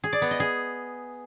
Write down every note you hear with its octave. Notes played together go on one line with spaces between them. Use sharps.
G#4
D5
B3
D#5
G#4